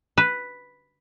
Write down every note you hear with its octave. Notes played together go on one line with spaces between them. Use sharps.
B4